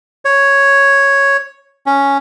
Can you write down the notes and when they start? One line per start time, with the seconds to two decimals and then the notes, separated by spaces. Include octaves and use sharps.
0.25 C#5
1.86 C#4